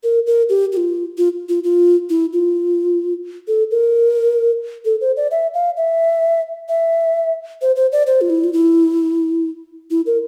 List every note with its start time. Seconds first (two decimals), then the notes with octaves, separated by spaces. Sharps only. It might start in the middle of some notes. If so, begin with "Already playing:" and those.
0.03 A#4
0.27 A#4
0.49 G4
0.72 G4
0.77 F4
1.18 F4
1.49 F4
1.64 F4
2.10 E4
2.33 F4
3.48 A4
3.71 A#4
4.85 A4
5.01 C5
5.17 D5
5.31 E5
5.54 F5
5.77 E5
6.69 E5
7.62 C5
7.76 C5
7.92 D5
8.07 C5
8.21 F4
8.30 E4
8.44 F4
8.53 E4
9.91 E4
10.06 A#4